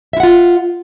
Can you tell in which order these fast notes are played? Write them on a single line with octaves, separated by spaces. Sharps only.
E5 E4 F#5 F4